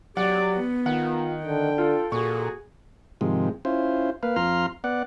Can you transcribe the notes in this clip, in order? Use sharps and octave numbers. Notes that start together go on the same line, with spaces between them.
F#3 G4 D5 F#5
B3
D#3 F4 F#5
D3 G5
F4 A4
A#2 F#4 G#4 A4 C#6
G#2 C3 D#3 F3 G#3
C#4 E4 F4 C5
A#3 B4 F5
F2 F4 A#5 C6 F6
B3 D5 F#5